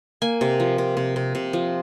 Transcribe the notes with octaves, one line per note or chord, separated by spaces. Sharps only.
A#3 G#5
C3
F3
C3
C3
C3
C3
F3